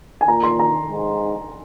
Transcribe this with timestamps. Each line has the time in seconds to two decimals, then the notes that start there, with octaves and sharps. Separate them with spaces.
0.21 G#5
0.28 A#2 A#5
0.43 C6
0.59 A#5
0.90 G#2